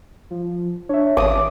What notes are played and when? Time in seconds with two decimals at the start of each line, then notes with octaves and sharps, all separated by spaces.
0.30 F3
0.89 D4 C#5 E5
1.17 G#1 D6 D#6